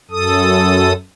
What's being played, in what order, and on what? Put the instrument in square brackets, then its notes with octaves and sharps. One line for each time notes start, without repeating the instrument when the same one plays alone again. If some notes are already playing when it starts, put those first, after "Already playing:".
[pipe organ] F#2 A4 D#6